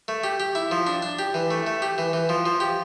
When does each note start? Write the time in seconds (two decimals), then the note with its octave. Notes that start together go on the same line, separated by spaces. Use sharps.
0.08 A3
0.24 G4
0.40 G4
0.55 E4
0.71 F3
0.87 D4
1.02 D4
1.19 G4
1.34 E3
1.51 A3
1.67 A3
1.82 G4
1.98 E3
2.13 E3
2.29 F3
2.46 F3
2.60 G4